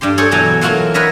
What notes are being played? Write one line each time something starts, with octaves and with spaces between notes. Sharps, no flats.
G2 G3 G4 C6
G#4 A4 C5 C#5
E2 B2 F#3 A4 G#5 A#5
E3 F#3 F4 F#4 A4 A#4
A#4 B4 C#5 D#5 E5 A#5